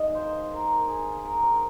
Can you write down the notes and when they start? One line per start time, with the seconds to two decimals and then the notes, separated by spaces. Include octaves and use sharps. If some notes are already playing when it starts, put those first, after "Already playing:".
Already playing: G#2 D#3 G#3 D#5 F5
0.15 C5
0.52 A#4
0.88 G#4
1.25 A#4
1.43 C5